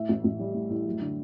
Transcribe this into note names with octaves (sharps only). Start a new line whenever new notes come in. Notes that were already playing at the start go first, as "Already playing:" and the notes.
Already playing: A2 E5
A1
A1
G3
A2
A2
F#2
D3